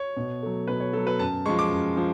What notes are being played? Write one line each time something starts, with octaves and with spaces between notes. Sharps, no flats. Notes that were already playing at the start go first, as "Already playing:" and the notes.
Already playing: C#5
B2
F#3 A3
B2 B4
C#5
F#3 A3 A4
B4
F#2 A5
F3 G#3 C#6
D6
F#2
F3